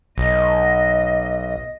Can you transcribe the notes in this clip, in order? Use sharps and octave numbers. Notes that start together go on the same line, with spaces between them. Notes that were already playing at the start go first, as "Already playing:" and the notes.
B1 D#5